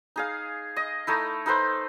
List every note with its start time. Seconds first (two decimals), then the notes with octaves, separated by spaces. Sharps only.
0.16 D#4 G#4 F5
0.76 D#5
1.07 A3 D#4 E4
1.46 D#4 A4 B4 C5